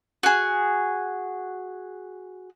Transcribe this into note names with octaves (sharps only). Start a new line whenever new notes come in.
F#4 G#4